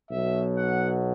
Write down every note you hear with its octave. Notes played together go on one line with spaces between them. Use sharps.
B1 B2 F#3 E5
F#5